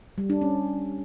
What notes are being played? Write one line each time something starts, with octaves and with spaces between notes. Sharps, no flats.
G3
D4
C#4